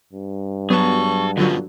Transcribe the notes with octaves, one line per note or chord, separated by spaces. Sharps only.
G2
F#3 B3 G#4 A5 C#6
F#2 B2 D3 F#3 F4